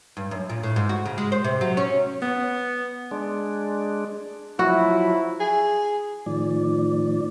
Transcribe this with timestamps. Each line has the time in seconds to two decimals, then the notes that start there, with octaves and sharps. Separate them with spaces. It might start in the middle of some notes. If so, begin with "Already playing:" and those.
0.17 G2
0.31 F#2
0.49 A#2
0.63 A2
0.76 G#2
0.89 F#4
1.06 C#3
1.18 G#3
1.32 C5
1.44 C3
1.61 F#3
1.77 C#4
2.22 B3
3.11 G#3 D4
4.59 F3 F#3 E4 F#4
5.40 G#4
6.26 A2 D#3 F3 D5